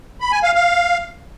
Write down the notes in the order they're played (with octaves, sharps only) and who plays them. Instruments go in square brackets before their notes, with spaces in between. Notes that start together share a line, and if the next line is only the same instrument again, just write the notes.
[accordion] B5
G#5
F5
F5